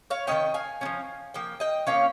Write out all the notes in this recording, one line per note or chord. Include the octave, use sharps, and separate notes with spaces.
C#5 F5
D#3 A#3 C#4 D#5 G5
F5 G#5
F3 A#3 C#4
F3 A#3 G5
D#5 G5
F3 A#3 C#4 C#5 F5